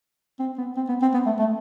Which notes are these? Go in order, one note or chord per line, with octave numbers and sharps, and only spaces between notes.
C4
B3
C4
B3
C4
B3
A3
A3